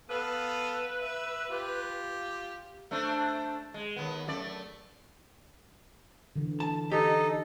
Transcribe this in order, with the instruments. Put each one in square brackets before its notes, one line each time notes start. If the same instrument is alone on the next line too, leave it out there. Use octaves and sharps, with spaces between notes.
[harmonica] B3 A4 F5 [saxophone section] B4
[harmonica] E5
F4 G4
[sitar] A3 D4 C5
G#3
D#2 B3
F#2 A3 D5
[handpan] D3 E3
[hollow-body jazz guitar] A5
[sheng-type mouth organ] D#4 A4 D#5 [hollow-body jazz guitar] G4